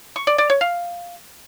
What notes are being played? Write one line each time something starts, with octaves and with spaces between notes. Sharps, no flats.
C#6
D5
D5
C#5
F5